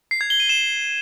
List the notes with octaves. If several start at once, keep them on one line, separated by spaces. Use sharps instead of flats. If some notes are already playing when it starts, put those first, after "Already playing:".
C7
G#6
G7
D#7
E7